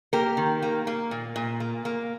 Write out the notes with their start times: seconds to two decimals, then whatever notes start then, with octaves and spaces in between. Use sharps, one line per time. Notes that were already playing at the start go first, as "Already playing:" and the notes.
0.13 A#3 G4 A#4
0.37 D#3
0.62 A#3
0.87 A#3
1.11 A#2
1.36 A#2
1.60 A#3
1.85 A#3